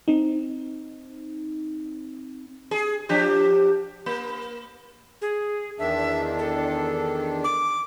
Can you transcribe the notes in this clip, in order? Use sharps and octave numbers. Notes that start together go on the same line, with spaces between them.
C4 D#4
G#4
F3 D4 G4
A#3
G#4
E2 D#3 D4 E5
A4
D6